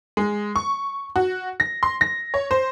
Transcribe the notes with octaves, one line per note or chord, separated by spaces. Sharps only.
G#3
C#6
F#4
A#6
C6
A#6
C#5
C5